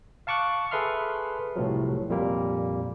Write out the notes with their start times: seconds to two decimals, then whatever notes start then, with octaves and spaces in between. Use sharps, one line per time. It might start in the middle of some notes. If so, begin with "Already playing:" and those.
0.27 F5 A5 C#6 D6 F#6
0.71 G#4 A4 B4 E5 C6 F6
1.56 C2 A2 C3 F3 F#3
2.09 F2 A#2 G3 A#3